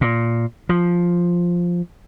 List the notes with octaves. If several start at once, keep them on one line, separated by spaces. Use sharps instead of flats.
A#2
F3